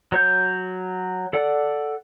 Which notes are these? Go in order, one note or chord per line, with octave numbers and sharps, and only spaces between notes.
F#3 C#5 G6
A4 D5 F#5